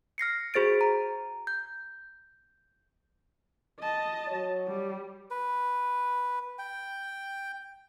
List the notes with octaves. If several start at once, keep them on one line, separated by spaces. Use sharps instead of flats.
F6 A#6 C7 C#7
F#4 G#4 C5 A6 D7
A#5
G6
D#5 A5
F#3 F#4 C#5
G3
B4
G5